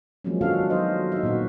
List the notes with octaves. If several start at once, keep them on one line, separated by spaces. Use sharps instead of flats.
F3 F#3 G#3 A#3 C4 C#4
D#3 C#4 D4 F#4 A4 F5
F#3 B3 D#4 C5 D#5
D#4 E5
A#2 B3 C#4 F#4